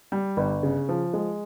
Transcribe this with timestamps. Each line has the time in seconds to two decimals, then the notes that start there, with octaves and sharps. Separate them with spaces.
0.12 G3
0.37 G1
0.63 C#3
0.89 F3
1.13 G#3